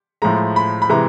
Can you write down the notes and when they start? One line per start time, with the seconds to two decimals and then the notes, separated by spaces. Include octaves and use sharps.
0.22 A2 F3 G#3 A#5
0.56 B5
0.82 B5
0.89 C3 E3 G#3 A#5